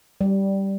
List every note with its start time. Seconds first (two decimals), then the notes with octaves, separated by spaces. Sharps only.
0.21 G3